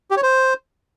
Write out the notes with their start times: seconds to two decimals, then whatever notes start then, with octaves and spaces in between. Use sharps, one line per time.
0.11 G4
0.17 C#5
0.23 C5